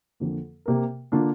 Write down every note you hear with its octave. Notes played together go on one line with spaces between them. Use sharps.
F2 D3 A#3
C3 A#3 G4 A#4
D3 A#3 D4 F4